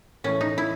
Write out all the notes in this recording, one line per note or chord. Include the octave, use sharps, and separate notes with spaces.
A2 E3 A3 C#4
D#4
E4